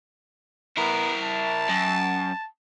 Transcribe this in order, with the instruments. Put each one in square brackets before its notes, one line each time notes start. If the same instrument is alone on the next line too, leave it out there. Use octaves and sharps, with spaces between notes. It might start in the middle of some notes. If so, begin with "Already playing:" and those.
[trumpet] B3 [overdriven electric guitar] E4 A#4
[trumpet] A5
[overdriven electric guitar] F#2